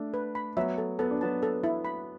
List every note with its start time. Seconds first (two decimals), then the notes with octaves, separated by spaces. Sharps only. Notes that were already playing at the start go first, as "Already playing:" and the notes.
Already playing: A3 D4
0.14 B4
0.35 B5
0.57 F#3 B3 E5
0.78 A4
0.99 B3 A4
1.11 D4
1.21 F#3 B3 A5
1.43 A4
1.64 E4
1.85 B5